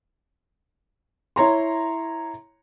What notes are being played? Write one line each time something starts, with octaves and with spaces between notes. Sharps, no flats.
E4 C#5 A#5 C6